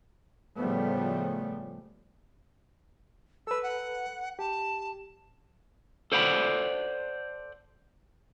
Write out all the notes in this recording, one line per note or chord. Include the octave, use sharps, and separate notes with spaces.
A2 C#3 F3 G3 A3 B3
A4 B4 E6
F#5
G4 A5
A4 C5 D5 F#5 A#5 B5